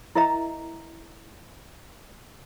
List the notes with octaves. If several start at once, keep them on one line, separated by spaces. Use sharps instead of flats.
E4 A#4 D#5 E5 A#5